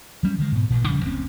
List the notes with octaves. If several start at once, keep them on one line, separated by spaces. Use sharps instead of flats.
F#3 G3 C#4
D3 D#3 G#3
G#2 B2
A1 A#2
D#1 C#3 F3 G3
F#1 D2 C4 C#4